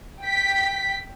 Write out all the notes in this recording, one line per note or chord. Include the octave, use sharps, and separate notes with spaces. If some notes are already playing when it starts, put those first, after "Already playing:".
G5 B6